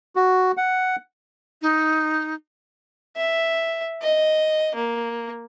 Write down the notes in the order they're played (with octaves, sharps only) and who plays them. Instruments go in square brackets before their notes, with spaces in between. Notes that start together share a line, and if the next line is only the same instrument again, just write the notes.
[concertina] F#4
F#5
[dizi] D#4
[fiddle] E5
D#5
A#3